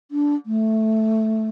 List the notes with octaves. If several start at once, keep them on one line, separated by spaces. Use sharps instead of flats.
D4
A3